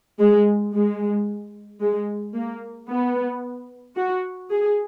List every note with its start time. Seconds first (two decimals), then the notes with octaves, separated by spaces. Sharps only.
0.20 G#3
0.74 G#3
1.81 G#3
2.34 A#3
2.89 B3
3.96 F#4
4.50 G#4